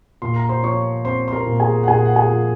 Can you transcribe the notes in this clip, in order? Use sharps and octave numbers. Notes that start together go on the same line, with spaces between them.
A#2 C6
A#5
C5 C6
F3 C#5 C#6
C4 C5 C6
C6
A#4 A#5
A#2
G#4 G#5
F#5
A#2 G#4 G#5
F#5
G#4 G#5
F3